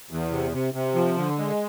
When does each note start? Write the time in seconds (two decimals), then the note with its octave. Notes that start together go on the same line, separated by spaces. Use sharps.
0.10 E2
0.31 C3
0.52 C3
0.74 C3
0.95 F3
1.17 D3
1.38 G#3